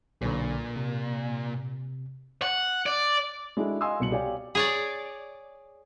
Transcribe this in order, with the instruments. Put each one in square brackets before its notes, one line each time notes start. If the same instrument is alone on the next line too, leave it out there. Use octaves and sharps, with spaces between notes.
[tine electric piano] B1 D3 [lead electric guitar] A#2
[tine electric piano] C3
[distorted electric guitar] F#5
D5
[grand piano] G#3 D4 E4 F#4 G#4 A4
D#5 F5 G#5 C6 D#6 E6
C2 B2 C#7 F#7
G4 C#5 D5 F5 G#5
[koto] G#4 C#5 D5